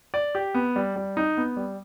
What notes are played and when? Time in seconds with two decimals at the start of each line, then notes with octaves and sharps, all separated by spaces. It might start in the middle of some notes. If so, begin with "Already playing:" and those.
0.14 D5
0.35 G4
0.54 B3
0.76 G3
0.96 G3
1.17 D#4
1.37 B3
1.57 G3